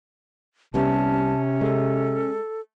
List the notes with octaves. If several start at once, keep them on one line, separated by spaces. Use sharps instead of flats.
C2 C3 G3 B3 C#4 A5
G#3 A4